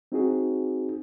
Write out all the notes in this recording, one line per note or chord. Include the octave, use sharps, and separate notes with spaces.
C4 D#4 F#4 G#4